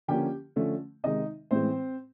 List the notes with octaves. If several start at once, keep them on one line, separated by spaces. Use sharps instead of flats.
D3 F3 A#3 C#4 G4 G5
D3 F3 A3 C#4
C3 D#3 G#3 D#4 D#5
A2 E3 G#3 C4 C5